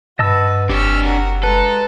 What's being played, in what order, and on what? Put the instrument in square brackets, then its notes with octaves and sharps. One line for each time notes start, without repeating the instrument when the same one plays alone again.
[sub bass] G2 [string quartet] F#4 B4 [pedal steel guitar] D#5 A5 E6
[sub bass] F#1 [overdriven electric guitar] D4 C#5 [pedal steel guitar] G4 [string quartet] E6 F6
[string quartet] F#4 A#4
[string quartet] G#3 A#5 [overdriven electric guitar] A4 [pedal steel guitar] B4